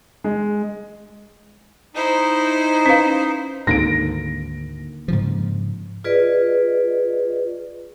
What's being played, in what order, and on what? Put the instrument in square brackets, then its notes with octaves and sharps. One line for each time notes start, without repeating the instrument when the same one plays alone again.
[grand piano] G#3
[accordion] D#4 [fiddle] E4 C5
[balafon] C#4 B4 F5
[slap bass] D2 G#2 [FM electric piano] D3 D#3 A#3 [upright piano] A#6 D7
[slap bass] G#2 C#3 F3
[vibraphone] F4 G#4 B4 D5 D#5